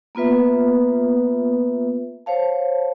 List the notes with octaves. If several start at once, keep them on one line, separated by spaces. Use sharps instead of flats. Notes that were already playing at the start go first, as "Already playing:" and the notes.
A#3 B3 F4 B4 E5
C5 C#5 F5 A5